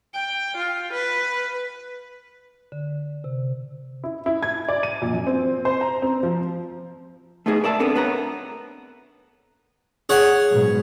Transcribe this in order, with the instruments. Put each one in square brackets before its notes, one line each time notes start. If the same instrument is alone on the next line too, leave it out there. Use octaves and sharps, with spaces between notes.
[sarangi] G5
F4
B4
[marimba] D3
C3
[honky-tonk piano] E4
E4
G#6
D5
D#7
A#1
F#2
C4
C5
A#5
C4
F3
[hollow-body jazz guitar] A3 B3 D#4 G#4 D#5
A#4 D5 E5 A5
B3 C4 D4 A4 A#4
B3 B4 C#5 A#5
[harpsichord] G#4 C#5 F#5
[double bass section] G#2 B2 F#3